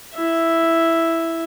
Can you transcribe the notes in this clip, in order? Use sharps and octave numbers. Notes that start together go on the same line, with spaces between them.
E4 E5